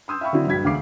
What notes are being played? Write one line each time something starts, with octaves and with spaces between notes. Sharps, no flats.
C6 D#6 E6 G6
E5 F5 G5 B5 C#6 E6
D3 F#3 C4 E4
A#1 G2 F#3 G#6 B6
E1 D2 F5 D6 C7